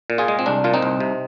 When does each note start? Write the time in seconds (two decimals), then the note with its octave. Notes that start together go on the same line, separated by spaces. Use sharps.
0.10 A#2
0.18 F4 G#4
0.28 G#3
0.39 C4
0.46 C2 D4
0.64 A#2 F4
0.74 C4 D#4
0.82 C2
1.00 C3